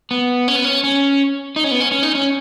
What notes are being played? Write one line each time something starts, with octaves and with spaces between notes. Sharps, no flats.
B3
C#4
B3
C#4
C#4
D#4
C#4
B3
C#4
C#4
D#4
C#4